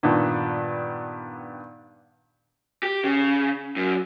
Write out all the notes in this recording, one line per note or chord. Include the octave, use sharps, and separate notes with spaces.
G2 A#2 D#3 B3 D4
G4
C#3
F#2